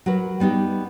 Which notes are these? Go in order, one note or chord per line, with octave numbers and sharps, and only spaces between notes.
F#3 F#4 A#4 B4
G3 B3 D#4 G4